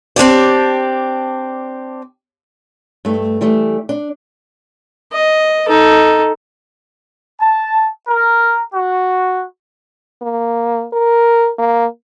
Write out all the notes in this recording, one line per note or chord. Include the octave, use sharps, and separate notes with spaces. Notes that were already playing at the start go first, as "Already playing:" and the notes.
C4 D4 G4 D5
G2 A3
E3 G3 A3
D4
D#5
D#4 A4
A5
A#4
F#4
A#3
A#4
A#3